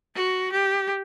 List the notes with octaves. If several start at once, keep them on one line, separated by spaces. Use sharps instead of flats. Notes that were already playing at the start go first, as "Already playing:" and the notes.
F#4
G4